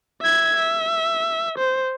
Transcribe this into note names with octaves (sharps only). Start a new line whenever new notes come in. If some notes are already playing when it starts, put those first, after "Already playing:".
E5 G#6
E5
C5